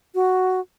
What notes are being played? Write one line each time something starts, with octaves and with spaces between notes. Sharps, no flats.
F#4